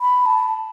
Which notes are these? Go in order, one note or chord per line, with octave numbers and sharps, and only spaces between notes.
B5
A5